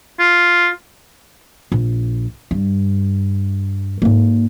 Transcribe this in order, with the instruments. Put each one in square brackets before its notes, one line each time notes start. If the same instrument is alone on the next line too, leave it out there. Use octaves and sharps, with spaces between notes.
[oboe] F4
[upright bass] A#1
G2
G#2 A#3